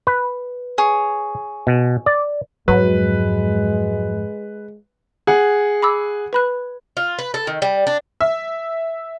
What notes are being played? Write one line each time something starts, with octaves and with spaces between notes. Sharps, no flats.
B4
G#4 C#5
B2
D5
F2 G#2 F#3 G#3 B4
G#4 F#5
B5 D6 E6
B4 B5 F#6
F4
B4
A4
D#3
G3
D4
E5